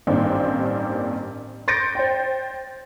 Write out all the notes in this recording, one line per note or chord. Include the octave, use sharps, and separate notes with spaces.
A1 G2 D#3 A#3 C4 D4
C6 G6 A6 A#6 C#7 D7
C5 G5